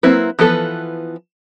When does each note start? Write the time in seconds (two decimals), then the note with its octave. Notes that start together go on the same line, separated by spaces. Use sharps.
0.03 F#3 A#3 C4 E4 B4
0.39 E3 F3 B3 A4 B4